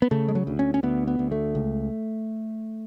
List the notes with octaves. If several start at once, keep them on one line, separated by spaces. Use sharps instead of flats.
B3
C#3 A3
G#3
F#3
D2
C#4
C#4
D2 B3
B3
D2
A3
C#2